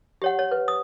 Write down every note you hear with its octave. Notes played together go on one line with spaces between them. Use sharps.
G4 C#5 F#5
C#5
B4
D#6